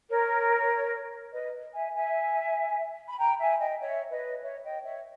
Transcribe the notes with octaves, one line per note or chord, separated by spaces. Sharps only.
A#4 C#5
B4 D#5
E5 G#5
E5 G#5
B5
G5 A#5
E5 G#5
D#5 G5
C#5 E5
B4 D#5
C#5 E5
D#5 G5
C#5 E5